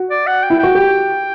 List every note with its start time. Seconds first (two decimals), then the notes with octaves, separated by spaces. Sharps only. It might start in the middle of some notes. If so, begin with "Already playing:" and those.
Already playing: F#4
0.10 D5
0.26 F#5
0.43 G5
0.50 E4
0.59 F#4 G5
0.75 G4 G5